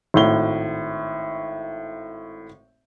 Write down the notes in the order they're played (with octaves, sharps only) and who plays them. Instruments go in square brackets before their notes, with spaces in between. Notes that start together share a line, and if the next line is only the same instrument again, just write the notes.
[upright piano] G#1 A2 G7